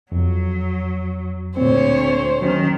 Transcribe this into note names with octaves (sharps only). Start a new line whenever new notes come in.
F2 F#3
D2 A#2 C4 C5 C#5
D#3 F#3 C#4